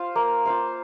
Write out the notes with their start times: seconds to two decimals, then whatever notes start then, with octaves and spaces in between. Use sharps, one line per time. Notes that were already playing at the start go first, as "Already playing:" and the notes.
Already playing: F4 C5 F5
0.16 A#3
0.45 F4 C5 F5